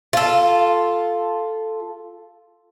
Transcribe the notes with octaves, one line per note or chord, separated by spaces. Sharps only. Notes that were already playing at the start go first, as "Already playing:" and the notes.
F4 A4